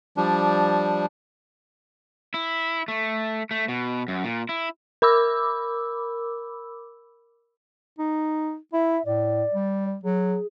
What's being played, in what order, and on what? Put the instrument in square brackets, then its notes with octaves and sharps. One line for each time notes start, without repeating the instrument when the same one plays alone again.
[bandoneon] F3 G3 D4
[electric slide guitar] E4
A3
A3
B2
F#2
A#2
E4
[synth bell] A#4 B5 D6 E6
[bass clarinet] D#4
[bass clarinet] E4 [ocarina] E5
[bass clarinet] A2 [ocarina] D5
[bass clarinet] G3
[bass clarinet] F#3 [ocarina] G#4